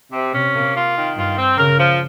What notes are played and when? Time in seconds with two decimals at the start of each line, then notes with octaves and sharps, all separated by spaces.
0.12 C3
0.33 C3 C#4
0.54 A#3
0.75 F4
0.95 D#3
1.16 G2 F4
1.37 C4
1.57 C#3 A#4
1.79 F3